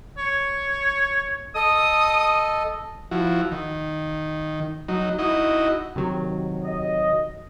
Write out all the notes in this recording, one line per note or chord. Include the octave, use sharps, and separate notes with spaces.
C#5
A4 D#5 D#6
F3 E4 F#4
D#3
F#3 D#4
D#4 E4 F#4 D#5
C3 D#3 F#3
D#5